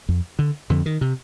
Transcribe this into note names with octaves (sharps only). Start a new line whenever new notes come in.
F2
D3
F2 D3
D#3
C3